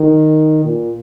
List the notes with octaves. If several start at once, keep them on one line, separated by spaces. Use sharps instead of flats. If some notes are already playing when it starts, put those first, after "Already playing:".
Already playing: D#3
A#2